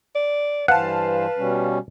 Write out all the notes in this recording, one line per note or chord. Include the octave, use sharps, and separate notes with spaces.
D5
G2 E3 B4 C5 F5 F#5 A5
B2 G3 C#4